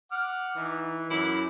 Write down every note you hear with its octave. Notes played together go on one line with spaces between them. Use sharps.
F#5 D6 F6
E3 D#4
F#2 E4 D6